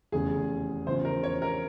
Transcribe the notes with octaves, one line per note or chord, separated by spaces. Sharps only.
F1 E2 C#3 G#4
E2 C#3 F3 C5
A#4
C#5
A#4